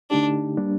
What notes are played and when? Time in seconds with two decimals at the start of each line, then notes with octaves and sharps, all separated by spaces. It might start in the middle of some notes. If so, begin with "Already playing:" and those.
0.10 D3 A3 D4 D#4 G4
0.57 G3 A#3 D4